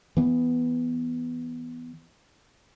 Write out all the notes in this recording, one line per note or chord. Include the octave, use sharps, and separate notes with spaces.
E3 B3